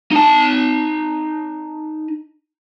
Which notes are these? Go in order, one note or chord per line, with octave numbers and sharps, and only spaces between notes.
D#4 A5